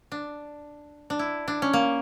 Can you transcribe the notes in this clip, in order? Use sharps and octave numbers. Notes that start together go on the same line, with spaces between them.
D4
D4
E4
D4
C#4
A#3